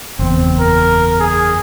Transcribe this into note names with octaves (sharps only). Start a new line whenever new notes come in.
F#1 E2 C4
A#4
G#4